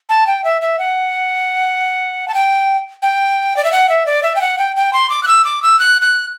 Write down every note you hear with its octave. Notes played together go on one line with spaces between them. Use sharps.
A5
G5
E5
E5
F#5
A5
G5
G5
D5
E5
F#5
E5
D5
E5
G5
F#5
G5
G5
C6
D6
F#6
E6
D6
E6
F#6
F#6